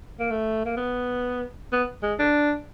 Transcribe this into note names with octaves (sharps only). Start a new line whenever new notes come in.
A#3
A3
A#3
B3
B3
G#3
D4